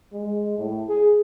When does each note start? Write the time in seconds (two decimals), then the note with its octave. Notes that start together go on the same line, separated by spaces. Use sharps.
0.13 G#3
0.58 A2
0.89 G#4